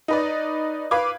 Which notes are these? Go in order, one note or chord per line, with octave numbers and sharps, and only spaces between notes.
D#4 B4 D5
B4 F5 D6 G#6